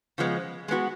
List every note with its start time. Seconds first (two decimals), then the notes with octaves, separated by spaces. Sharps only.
0.18 C#3 F3 G#3 B3
0.68 G#3 B3 F#4